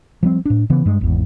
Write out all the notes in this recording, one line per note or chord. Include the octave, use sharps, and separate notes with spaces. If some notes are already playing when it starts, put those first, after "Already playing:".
F3 G3 C4
A2 D4
C#3 E3 B3
G2 G#3
G#1 E2